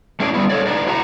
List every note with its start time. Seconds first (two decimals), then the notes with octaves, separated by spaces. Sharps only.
0.20 A3 C#4 E4 G#4 D5
0.34 G3 B3 E4
0.49 A4 C#5 D5
0.66 D#4 B4 D5
0.87 E4 F#4 E5 G#5 A#5